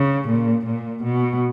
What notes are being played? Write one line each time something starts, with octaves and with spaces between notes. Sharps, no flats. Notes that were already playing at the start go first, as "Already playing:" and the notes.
Already playing: C#3
A#2
A#2
B2